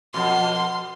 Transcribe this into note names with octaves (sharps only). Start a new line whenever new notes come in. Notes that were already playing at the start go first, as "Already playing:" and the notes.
F2 B2 C6